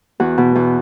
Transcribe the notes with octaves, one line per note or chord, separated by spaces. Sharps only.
E2 F#4
B2
E2